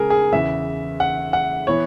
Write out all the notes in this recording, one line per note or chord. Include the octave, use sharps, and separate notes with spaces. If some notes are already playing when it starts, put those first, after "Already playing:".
Already playing: C#3 G#3 G#4 A#4
G#4
E2 C#3 E3 E5
F#5
F#5
E3 B3 C#5